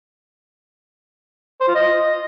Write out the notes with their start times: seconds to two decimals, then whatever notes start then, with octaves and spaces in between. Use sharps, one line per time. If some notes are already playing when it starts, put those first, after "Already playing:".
1.60 C5
1.68 F4
1.75 D#5